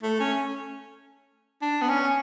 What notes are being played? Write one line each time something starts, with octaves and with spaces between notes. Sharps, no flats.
A3
C#4
D4
B3
C#4